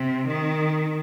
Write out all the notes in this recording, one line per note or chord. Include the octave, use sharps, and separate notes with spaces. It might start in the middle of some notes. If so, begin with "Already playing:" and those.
Already playing: C3
D#3